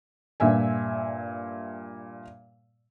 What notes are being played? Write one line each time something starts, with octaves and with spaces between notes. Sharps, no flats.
G2 A#2 E5 G#5